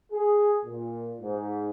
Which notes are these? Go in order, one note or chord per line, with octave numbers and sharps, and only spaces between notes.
G#4
A#2
G#2